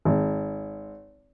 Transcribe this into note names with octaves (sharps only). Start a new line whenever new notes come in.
G#1